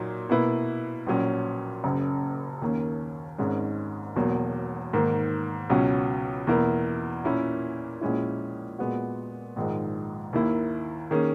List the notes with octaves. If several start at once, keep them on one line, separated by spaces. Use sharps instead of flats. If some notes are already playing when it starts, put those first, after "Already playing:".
Already playing: A#2 F#3 A#3 D#4
B2 A#3 E4 B4
A#1 A#2 F#3 C#4
F#1 F#2 C#3
D#2 D#3 A#3 C#4
G#1 G#2 D#3 G#3 C#4
E1 E2 B2 F#3 A#3
G#2 D#3 A#3
C#2 B2 F#3 C#4 F#4
E2 B2 A#3 E4 A#4
A#2 A#3 C#4 E4
A#1 A#2 G#3 C#4 E4
A#2 G#3 B3 F#4
A#1 G#2 D#3 G#3
D#2 D#3 A#3 E4
D#3 A#3 C#4 G#4